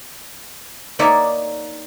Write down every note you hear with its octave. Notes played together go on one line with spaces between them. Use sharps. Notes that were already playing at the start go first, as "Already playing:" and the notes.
A#3 D#4 C#5 D5 E5